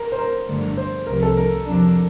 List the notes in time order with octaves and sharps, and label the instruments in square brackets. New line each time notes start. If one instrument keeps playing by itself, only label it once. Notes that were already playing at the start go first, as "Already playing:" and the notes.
Already playing: [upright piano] A#4
C5
A#4
[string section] G1 G2 D3 F3 A3
[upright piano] C5
[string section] C2 C3 F3 A3 [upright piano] A#4
[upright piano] A4
A#4
[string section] F2 C3 F3 A#3 D4